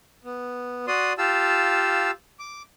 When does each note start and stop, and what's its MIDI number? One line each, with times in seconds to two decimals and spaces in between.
0.25 0.86 59
0.87 1.13 66
0.87 1.13 74
0.87 1.13 84
0.87 1.13 87
1.18 2.11 65
1.18 2.11 67
1.18 2.11 77
1.18 2.11 81
1.18 2.11 88
2.39 2.62 86